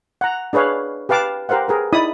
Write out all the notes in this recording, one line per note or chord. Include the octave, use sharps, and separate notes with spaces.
F#5 A#5
D4 G#4 B4 C#5 F5
G4 B4 F5 A5 D6
G4 A#4 C5 F5 F#5
G#4 A#4 B4
D#4 E4 D5 B5 D#6